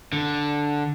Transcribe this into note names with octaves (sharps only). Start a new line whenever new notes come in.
D3